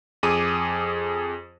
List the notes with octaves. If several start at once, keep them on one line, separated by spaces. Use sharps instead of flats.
F2 G#4 D6 D#7